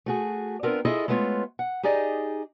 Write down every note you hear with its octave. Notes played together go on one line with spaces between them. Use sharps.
A3 F#4 G#4
B3 C4 D4 F4 A#4
E4 F4 G#4 A4 D#5
G#3 A3 B3 F4 C#5
F#5
D#4 G4 G#4 D5 D#5